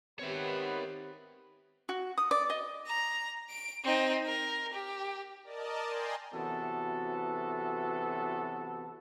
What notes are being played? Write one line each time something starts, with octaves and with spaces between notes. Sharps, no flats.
D#3 B3 C4 G4 B4 C#5 E5
F#4
D#6
D5
D#5
A#5
D7
C4 D#4
A#4
G4
A#4 D5 D#5 A5
G5 G#5 A#5 C6
C3 E3 F#3 B3 F#4 A4